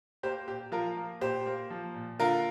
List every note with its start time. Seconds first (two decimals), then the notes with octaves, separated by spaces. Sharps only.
0.23 A#3 G4 C5
0.48 A#2 G4
0.72 F3 F4 A#4
0.97 A#3
1.21 A#2 G4 C5
1.46 A#3
1.70 F3
1.95 A#2
2.19 D3 F4 A#4